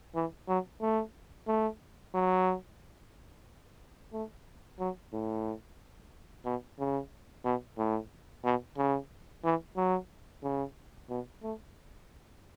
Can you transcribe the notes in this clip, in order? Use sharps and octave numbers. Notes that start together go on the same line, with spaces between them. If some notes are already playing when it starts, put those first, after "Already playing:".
E3
F#3
A3
A3
F#3
A3
F#3
A2
B2
C#3
B2
A2
B2
C#3
E3
F#3
C#3
B2
A3